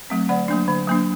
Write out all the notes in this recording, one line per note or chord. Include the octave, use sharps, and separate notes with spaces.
F#3 A3 C4
D3 D5 F#5
F#3 A#3 D4
D3
F#3 A#3 D4